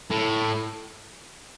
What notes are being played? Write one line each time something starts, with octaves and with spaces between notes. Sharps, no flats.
A2